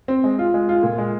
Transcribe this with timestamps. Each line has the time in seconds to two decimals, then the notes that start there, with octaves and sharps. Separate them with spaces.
0.08 C4
0.24 G#3
0.39 F4
0.54 G#3
0.69 F4
0.83 A#2
0.98 G#3